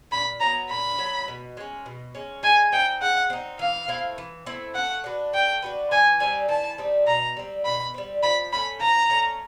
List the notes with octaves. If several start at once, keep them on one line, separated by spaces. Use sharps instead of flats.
A#2 B5
F#3 B3 A#5
A#2 B5
F#3 B3
B2
G#3 C#4
B2
G#3 C#4
G#3 G#5
C4 D#4 G5
G#3 F#5
C4 D#4
E3 F5
A3 C4 E4
E3
A3 C4 E4
A3 F#5
D4 F#4 B4
A3 G5
D4 F#4 B4
E3 G#5
G3 C4 D#4 G#5
E3 A5
G3 C4 D#4
B2 A#5
G3 C4
B2 B5
G3 C4
F3 B5
A3 C#4 B5
F3 A#5
A3 C#4